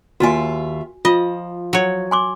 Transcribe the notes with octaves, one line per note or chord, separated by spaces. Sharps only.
D#2 F4 F#4 E5 G#5
F3 F4 D#5
F#3 C#5
G#5 C6 D6